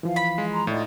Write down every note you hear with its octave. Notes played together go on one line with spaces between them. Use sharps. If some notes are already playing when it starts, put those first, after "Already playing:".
E3 F3 F5
B5
G#3
A#5 C6
A2 D#4 F4 D5